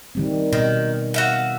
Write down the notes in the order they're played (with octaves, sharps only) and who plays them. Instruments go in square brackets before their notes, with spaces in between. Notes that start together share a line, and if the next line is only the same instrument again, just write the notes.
[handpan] D#3 G3 C4
[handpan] B2 [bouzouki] D#3
[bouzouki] F#4 E5 F5